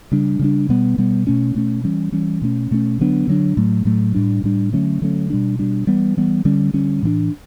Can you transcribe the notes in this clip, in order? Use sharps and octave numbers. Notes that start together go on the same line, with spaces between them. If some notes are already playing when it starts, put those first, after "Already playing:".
C#3 G3 D4
C#3 G3 D4
B2 G3 B3
B2 G3 B3
B2 A3 C#4
B2 A3 C#4
E3 G3 C#4
E3 G3 C#4
B2 A3 C#4
B2 A3 C#4
D3 F#3 B3 D4
D3 F#3 B3 D4
A2 F#3 A3
A2 F#3 A3
A2 G3 D4
A2 G3 D4
D3 F#3 A3 C#4
D3 F#3 A3 C#4
B2 G3 D4
B2 G3 D4
E3 G3 B3
E3 G3 B3
D3 G3 C#4
D3 G3 C#4
A2 E3 B3 D4